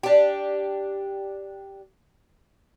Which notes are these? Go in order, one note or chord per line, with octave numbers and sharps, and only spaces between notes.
D4 G4